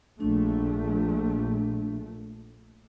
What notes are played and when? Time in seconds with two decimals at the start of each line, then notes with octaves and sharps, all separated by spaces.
0.20 A#1 A3 D4